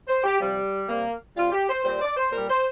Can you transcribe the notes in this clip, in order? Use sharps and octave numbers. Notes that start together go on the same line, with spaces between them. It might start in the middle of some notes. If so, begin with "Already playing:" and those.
C5
G4
C3 F3 G3
C3 G3 A#3
C3 G3 F4
G4
C5
A#2 G3 C5
D5
C5
A#2 G3 A#4
C5